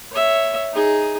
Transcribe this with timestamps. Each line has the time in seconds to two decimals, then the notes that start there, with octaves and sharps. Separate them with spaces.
0.12 C#5 E5
0.73 D#4 G#4